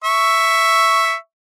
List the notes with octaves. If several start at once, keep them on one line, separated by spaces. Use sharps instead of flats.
E5 C#6